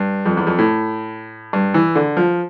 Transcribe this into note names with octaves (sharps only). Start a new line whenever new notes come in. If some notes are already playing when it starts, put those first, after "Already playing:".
Already playing: G2
F2
E2
F2
A2
G2
E3
D3
F3